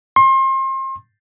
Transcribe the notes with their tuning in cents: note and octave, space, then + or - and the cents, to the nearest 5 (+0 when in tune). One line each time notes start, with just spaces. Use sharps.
C6 +35